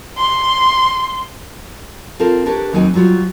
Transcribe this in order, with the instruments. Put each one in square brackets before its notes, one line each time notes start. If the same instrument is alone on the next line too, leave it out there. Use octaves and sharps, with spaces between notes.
[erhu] C6
[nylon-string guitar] C4 F4 A4 A#4 C5
D4 G4 A#4 B4 C#5
D#2 F#3 C4 D#4 F#4 G#5
F#3 G3 F4 F#4